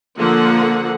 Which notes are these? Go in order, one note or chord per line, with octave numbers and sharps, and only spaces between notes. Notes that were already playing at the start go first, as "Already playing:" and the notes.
D3 F3 A#3 F4 A4 F#5